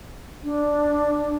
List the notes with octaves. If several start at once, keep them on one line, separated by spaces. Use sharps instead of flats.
D4